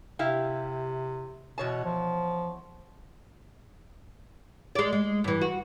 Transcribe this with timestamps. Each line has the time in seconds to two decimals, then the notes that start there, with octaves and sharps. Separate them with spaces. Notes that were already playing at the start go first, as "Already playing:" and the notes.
0.19 C3 E4 G4 F5
1.58 E2 B2 C#5 A5
1.84 F3
4.75 G#3 D5
4.93 G#3
5.24 G2 E3
5.41 F#4